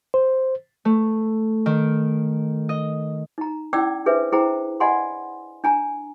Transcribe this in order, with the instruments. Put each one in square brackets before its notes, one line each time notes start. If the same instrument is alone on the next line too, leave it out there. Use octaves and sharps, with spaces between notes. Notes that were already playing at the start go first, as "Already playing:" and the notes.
[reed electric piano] C5
[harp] A3
D#3
D#5
[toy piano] D#4 A#5
C#4 E4 D5 G5 D6 E6
D4 G#4 B4 C5 E5
E4 G#4 C5 G5 A#5
D5 D#5 F#5 G#5 B5 C6
D4 G#5 A#5